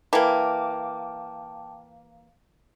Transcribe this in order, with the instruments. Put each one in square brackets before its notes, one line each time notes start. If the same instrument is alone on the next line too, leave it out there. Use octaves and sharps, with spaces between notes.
[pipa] E3 A#3 [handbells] G5 A5 D6